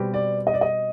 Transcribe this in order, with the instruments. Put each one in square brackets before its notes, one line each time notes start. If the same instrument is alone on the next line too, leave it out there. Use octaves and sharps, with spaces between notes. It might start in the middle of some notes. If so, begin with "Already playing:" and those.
Already playing: [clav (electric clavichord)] B2 G3 C4 G4 B4
[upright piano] D5
D#5
D5
D#5